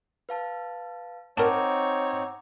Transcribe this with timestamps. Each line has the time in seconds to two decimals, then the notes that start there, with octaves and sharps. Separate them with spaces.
0.29 B4 F5 A5
1.38 C4 D4 D#4 A#4 C#5 F#5 A#5 D6